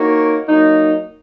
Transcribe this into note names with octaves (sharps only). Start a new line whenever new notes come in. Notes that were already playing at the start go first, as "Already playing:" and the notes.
Already playing: A#3 D#4 F#4 A#4 C#5
F#3 A#3 D#4